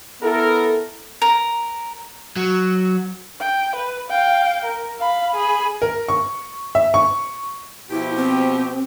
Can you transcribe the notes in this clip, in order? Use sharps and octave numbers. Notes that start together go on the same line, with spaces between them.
B3 E4 A4 A#4
A#4
F#3
G5
B4
F5 G5
A#4
F5 B5
G#4 B5
A#4
C#6
E5
C#6
B2 F3 E4 G4
C4